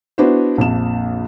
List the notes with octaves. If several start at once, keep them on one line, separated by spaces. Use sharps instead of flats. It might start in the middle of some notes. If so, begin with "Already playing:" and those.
B3 D4 E4 F#4 B4 C5
A#1 F2 E7